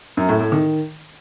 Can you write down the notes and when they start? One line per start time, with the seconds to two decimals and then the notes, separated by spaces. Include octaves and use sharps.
0.17 F#2
0.29 A2
0.40 A2
0.52 D#3